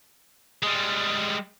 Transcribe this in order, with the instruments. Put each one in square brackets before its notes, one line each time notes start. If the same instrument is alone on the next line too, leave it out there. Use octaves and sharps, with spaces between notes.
[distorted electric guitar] G3 G#3